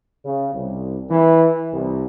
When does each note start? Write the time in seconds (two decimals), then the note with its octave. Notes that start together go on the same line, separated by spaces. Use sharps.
0.25 C#3
0.53 C2
1.10 E3
1.73 C2